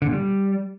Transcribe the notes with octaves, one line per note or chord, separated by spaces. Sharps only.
D3
A#2
G3